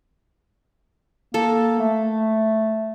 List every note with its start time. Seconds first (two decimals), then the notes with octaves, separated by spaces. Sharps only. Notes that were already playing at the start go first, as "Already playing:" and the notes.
1.34 A#3 A4
1.80 A3